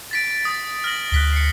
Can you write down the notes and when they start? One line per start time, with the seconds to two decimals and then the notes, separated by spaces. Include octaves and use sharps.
0.11 A6 B6 D7
0.45 D#6 A6
0.84 F6 A#6 F#7
1.12 D2 F#6 B6 G7
1.33 C7 C#7